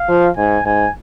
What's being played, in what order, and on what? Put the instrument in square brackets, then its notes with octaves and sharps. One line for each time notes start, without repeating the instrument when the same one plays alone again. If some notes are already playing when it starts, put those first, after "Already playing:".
Already playing: [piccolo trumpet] F5
[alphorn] F3
[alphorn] G#2 [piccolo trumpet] G#5
[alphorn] G#2 [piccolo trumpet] G#5